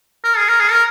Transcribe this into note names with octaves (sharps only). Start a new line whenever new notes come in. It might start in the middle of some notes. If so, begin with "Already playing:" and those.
A#4
G#4
A#4
G#4
A#4